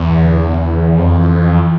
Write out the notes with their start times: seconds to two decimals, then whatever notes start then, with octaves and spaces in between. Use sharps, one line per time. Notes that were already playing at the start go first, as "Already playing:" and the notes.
Already playing: E2
0.09 G2
0.24 D3
0.98 F2 E3